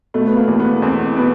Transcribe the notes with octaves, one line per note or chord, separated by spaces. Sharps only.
B2 A3
B3
A#3
E2
B3
E2 C4
B2 B3